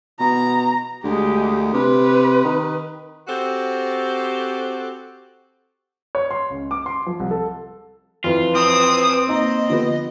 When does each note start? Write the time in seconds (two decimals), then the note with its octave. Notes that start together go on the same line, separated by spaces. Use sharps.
0.20 B2 A#5
1.04 D2 G#3 G4
1.74 C3 B4
2.45 D#3
3.28 C4 F#4 G4 A4 C5
6.15 C#5
6.31 C6
6.50 C#2
6.71 D6
6.86 C6
7.06 F3
7.20 C2
7.31 A4
8.24 F2 E3 F4 B4
8.55 C4 D#6
9.29 A#3 D#4 D#5 A#5
9.70 D3 F3 B3